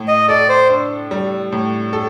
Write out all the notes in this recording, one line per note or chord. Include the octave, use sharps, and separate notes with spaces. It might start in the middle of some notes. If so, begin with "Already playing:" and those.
Already playing: A2
D#5
A4 D5
C5
D4
G3
A2
A4